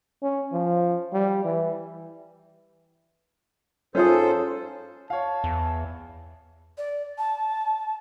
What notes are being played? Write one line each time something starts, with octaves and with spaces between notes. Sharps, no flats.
C#4
F3
G3
E3
G#2 C#4 F4 G#4 A4 C5
C#5 F5 A5
E2
D5
A5